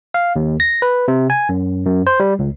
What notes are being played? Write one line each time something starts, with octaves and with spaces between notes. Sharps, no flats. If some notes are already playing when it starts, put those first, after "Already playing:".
F5
D#2
A#6
B4
C3
G#5
F#2
F#2
C5
G3
C#2